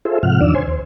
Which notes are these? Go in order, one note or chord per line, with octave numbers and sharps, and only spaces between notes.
F4 G#4 A4 C5 E5
G#2 C3 F3 F#5 F6
E2 D#3 F3 D4 D5 E6
C5 C#5 G#5 C6
D#2 C5